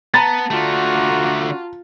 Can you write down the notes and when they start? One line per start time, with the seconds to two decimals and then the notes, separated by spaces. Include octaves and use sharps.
0.14 B3 A5 A#5 A6
0.51 D3 A3 F4 F#4